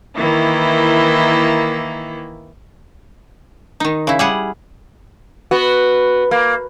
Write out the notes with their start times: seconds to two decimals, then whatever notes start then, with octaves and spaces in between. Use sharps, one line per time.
0.15 D#3 E3 A#3 E4
3.80 D#3 D#4
4.07 C#3 E4
4.19 G3 G#4 F#5
5.51 B3 F#4
6.31 A#3